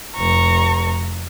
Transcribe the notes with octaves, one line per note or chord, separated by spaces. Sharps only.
F1 A#5 C#6